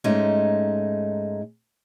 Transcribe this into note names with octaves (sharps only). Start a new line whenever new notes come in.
G#2 G#3 A3 C#4 D#4